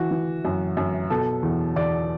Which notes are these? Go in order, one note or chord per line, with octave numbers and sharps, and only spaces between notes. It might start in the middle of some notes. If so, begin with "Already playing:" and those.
Already playing: E3 F#4
E3
F#2
F#2
B2 A4
E2
E2 D5